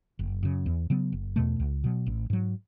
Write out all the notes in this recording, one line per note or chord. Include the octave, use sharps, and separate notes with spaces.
F#1
F#2 C#3
E2
C#3 F#3 B3
F#1
E2 B2 A3
C#2
B2 F#3
A1
G#2 F#3